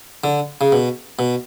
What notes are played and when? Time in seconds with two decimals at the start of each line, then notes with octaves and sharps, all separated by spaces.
0.24 D3
0.61 C#3
0.72 B2
1.19 B2